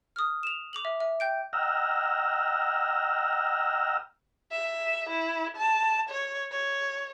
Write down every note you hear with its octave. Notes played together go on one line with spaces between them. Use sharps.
D#6 F6
E7 F7
D6 F7 F#7
E5
E5
G5 G6 D7
D#5 F#5 G5 A#5 E6 F6
E5
E4
A5
C#5
C#5